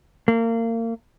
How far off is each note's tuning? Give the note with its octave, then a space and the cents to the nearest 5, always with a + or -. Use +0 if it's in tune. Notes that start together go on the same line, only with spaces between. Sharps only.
A#3 -30